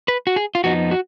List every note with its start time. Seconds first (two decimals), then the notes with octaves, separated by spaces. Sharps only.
0.08 B4
0.27 F#4
0.36 G#4
0.55 F4
0.64 F2 F3 B3 D#4 F#4
0.91 F#4